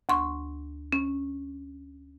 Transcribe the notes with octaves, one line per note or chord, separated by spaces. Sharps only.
D2 C6 C#6
C#4